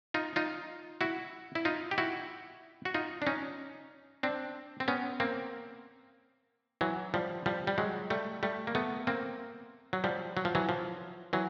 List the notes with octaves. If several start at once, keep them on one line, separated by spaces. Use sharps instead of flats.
D#4 F4
D#4 F4
E4 F#4
E4
D#4 F4
G4
E4 F#4
F#4
D#4 F4
D4
C#4 D#4
C4 D4
C4
B3 C#4
A#3 C4
E3 F#3
F3 G3
F3 G3
G3
F#3 G#3
G3 A3
G3 A3
A#3
A3 B3
A#3 C4
F#3
F3 G3
F#3
F3
E3 F#3
F3
E3 F#3